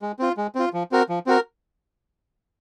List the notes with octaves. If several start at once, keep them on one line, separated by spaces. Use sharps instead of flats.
G#3
C4 F4
G#3
C4 F4
F3
C4 F#4 A#4
F3
C4 F#4 A#4